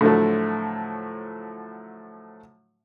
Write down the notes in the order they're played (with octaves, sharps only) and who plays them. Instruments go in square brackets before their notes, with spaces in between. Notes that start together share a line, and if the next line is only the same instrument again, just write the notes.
[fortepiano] A2 D3 F3 F#3 A3